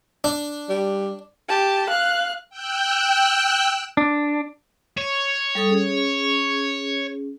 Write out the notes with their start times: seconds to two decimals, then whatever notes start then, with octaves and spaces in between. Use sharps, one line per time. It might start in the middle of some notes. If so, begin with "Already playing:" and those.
0.24 D4
0.69 G3
1.49 G4 A5
1.90 F5 F#6
2.49 G5 E6 F#6 G6
3.97 D4
4.98 C#5
5.55 G3 A4 D#6
5.70 C#4 G#4